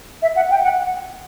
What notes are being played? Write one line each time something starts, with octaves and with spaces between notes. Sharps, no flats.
E5
F#5
G5
F#5